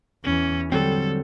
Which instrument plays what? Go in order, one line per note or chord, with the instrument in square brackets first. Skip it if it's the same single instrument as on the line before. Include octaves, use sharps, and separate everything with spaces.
[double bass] E2 E3 [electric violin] C#4
[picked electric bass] D3 F#3 C4 [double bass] G3 [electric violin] A4